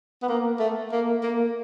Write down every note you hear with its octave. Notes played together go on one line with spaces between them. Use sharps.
B3
A#3
A3
A#3
A#3